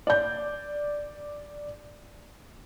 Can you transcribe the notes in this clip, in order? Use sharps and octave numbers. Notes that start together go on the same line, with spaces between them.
D5 G6